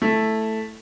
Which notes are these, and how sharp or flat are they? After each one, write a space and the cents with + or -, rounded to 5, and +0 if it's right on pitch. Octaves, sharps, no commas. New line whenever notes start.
A3 +0 E4 +0